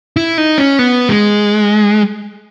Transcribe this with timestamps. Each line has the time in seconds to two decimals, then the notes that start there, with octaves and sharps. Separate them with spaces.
0.16 E4
0.38 D#4
0.58 C#4
0.79 B3
1.09 G#3